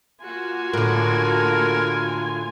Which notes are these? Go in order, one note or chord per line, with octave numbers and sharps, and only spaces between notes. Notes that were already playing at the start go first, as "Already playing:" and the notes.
A#3 F4 F#4 G#5
A2 D3 A#4